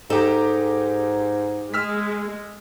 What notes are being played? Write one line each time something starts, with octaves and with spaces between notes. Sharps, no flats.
G#2 D#4 G4 A4 A#5
G#3 E6 F6 B6